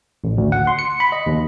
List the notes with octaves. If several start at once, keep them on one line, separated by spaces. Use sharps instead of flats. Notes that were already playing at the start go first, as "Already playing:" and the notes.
A1
D2
F#5
C6
C#7
B5
D#5
D#2